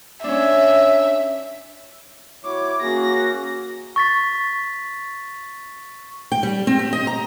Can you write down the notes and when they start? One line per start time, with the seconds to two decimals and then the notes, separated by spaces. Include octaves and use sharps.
0.24 C#4 D4 E5
2.45 E4 F#4 C#5 D6
2.81 A#3 C#4 F#4 G#4 A#6
3.96 C#6 A6 B6
6.32 G5
6.43 G3
6.67 C4
6.79 G4
6.93 D#5
7.07 A#5